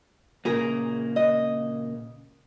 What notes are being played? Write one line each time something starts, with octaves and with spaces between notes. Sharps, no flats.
A#2 C#3 A#3 G#4 A#4
D#5